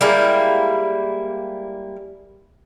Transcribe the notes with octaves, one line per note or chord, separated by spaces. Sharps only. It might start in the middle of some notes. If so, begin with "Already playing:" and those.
G3 G#3 A#3 E4